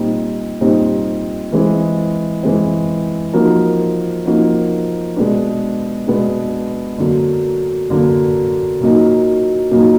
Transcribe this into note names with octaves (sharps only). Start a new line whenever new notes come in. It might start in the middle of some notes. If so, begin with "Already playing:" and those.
Already playing: A#2 G3 C4 D#4
A#2 G3 C4 D#4
E3 G#3 C4
E3 G#3 C4
F3 A#3 D#4 F#4 A#4
F3 A#3 D#4 F#4 A#4
B2 G#3 B3 D4
B2 G#3 B3 D4
D3 F#3 A#3
D3 F#3 A#3
A#2 F#3 A#3 D#4
A#2 F#3 A#3 D#4